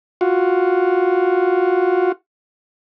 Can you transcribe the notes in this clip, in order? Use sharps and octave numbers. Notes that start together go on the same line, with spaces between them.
F4 F#4